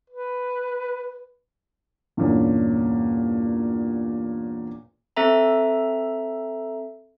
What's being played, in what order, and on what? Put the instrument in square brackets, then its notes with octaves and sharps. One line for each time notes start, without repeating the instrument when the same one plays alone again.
[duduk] B4
[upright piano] E2 G2 A#2 C#4
[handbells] C4 A4 E5 A#5